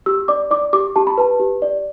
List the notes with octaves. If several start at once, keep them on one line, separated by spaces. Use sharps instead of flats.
G4 E6
D5 D6
D5 D6
G4 D6
G4 A5
B5
B4 A5
G4
D5